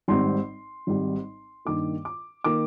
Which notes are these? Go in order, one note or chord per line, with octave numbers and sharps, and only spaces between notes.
G#1 G#2 G3 C4 C6
G#1 G#2 G3 C4
G2 D#3 A#3 D6
D6
D#3 A#3 D6